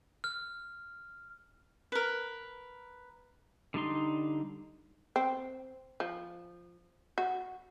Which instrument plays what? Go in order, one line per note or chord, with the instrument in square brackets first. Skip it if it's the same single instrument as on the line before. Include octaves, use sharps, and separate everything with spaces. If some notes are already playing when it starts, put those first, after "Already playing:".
[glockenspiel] F6
[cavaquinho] A#4 B4
[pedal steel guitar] D3 G3 D#4 C6
[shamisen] C4
F3
F#4